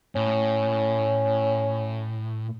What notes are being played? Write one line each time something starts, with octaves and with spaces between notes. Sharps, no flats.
A2 C#4